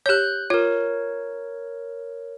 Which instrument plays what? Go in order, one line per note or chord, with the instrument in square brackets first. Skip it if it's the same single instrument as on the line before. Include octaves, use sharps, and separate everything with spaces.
[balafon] G4 C#5 [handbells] F#6 G6
[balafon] F4 [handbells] A#4 C#5